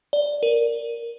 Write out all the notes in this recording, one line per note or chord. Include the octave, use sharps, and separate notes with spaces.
D5
A#4